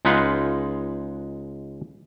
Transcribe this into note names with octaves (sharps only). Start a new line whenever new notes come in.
C#2 G#3 D#4 F4 B4 F#5